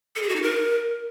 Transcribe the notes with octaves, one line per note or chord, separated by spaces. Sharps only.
A4
G#4
F#4
D#4
A#4